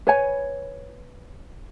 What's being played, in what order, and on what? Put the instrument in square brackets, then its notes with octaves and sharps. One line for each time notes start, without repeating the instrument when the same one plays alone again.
[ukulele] B4 C#5 G#5